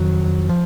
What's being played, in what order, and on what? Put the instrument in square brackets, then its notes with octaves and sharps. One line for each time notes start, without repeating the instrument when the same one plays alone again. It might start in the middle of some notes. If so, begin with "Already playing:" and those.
Already playing: [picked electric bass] F2 D#3 F#3
F3